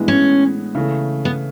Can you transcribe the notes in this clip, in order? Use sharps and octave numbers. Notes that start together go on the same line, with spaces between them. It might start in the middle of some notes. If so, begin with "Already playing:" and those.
Already playing: A2 E3 G#3 B3 D4
C#4
C#3 E3 A3
B3